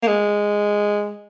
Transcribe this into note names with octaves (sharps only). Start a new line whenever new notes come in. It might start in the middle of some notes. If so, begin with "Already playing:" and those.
A#3
G#3